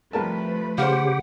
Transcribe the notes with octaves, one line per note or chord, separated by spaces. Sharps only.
C2 F3 A3 A#4 B4 A5
C#3 G4 C5 F5 F#5